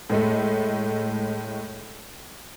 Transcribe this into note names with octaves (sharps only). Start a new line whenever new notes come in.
A2 G#3 A3